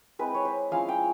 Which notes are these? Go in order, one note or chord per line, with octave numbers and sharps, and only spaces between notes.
G#3 C4 E4 B4
C#5
C5
F3 G#3 C#4 E4 F5
G5